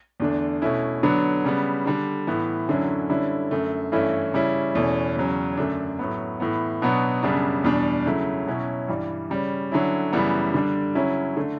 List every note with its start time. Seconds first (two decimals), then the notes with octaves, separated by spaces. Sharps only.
0.20 E2 D3 A3 D4
0.62 B2 A3 C#4 E4
1.03 D3 F#3 B3 D4
1.44 C#3 G3 B3
1.85 D3 G3 D4
2.27 A2 E3 B3
2.68 F#2 D3 F#3 C#4 E4
3.10 D3 G3 C#4 E4
3.51 F#2 D3 A3
3.92 G2 E3 A3 C#4 E4
4.34 C#3 G3 C#4 E4
4.75 E2 B2 A3 C#4 E4
5.16 E2 C#3 F#3 C#4
5.57 F#2 D3 A3 D4
5.99 A2 F#3 B3
6.40 A2 E3 B3
6.82 B2 F#3 B3 D4
7.23 F#2 C#3 G3 B3 D4
7.64 E2 B2 G3 D4
8.06 C#3 F#3 A3 E4
8.47 B2 F#3 C#4 E4
8.88 G2 E3 G3
9.30 C#3 G3 C#4
9.72 D3 F#3 C#4 E4
10.13 F#2 C#3 E3 G3 B3
10.54 D3 G3 D4
10.95 C#3 F#3 C#4 E4
11.37 D3 A3